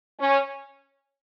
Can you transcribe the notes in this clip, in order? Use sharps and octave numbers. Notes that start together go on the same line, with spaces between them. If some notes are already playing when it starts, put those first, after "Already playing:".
C#4